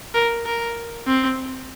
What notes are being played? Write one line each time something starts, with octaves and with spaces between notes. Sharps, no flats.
A#4
A#4
C4